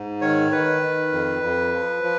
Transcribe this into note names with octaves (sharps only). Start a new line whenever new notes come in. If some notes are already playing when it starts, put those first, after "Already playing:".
Already playing: G#2
D#3 C#5
D#3 B4
D#3
F2
F2
F3
F3